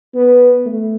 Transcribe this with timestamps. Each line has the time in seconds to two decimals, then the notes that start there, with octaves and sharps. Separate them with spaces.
0.14 B3
0.66 A3